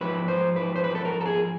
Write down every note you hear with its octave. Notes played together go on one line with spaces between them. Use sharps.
G#2 F3 B4
C5
B4
C5
B4
A4
A#4
A4
G#4